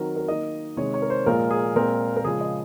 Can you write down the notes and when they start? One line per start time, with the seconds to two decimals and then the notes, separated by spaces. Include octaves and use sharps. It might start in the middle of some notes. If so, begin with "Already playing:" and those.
Already playing: D#3 F#3 C4 A#4
0.16 A#4
0.28 D#3 A#3 D#5
0.77 C3 D#3 G#3 C#5
0.94 C#5
1.02 A#4
1.10 C5
1.26 A#2 F3 G#3 A#4
1.50 G#4
1.76 A#2 G#3 C4 A#4
2.16 A#4
2.24 C#3 F3 G#3 G#4
2.41 D#5